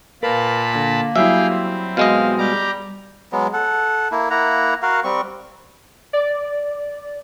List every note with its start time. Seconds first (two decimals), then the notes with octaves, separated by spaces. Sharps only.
0.23 A#2 A#4 B4 F5 A5 B5
0.74 D3 A#3 A#6
1.16 F#3 G3 E4 G#4 E5 F5 G5
1.49 C4
1.97 B2 G#3 D#5 F5
2.39 G3 G4 A#5 D6
3.32 F#3 G#3 B3
3.53 A4 F#5
4.11 A#3 E4
4.30 A#3 E4 F#5 A#5
4.82 F#4 A#4 F5 F#5
5.04 G3 C4 C#6
6.13 D5